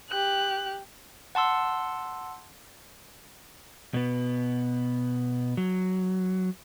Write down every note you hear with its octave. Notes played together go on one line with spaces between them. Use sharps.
G4 F#6
F#5 A5 C6 E6
B2 B3
F#3